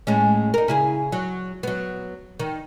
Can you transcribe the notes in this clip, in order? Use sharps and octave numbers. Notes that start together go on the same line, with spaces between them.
A2 G#3 C#4
D#4 A#4
C#3 E4 G#4
F#3
F#3 B3
D#3